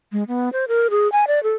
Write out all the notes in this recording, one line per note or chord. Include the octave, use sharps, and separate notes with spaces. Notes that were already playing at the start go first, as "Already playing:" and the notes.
G#3
B3
C5
A#4
G#4
G#5
D5
A4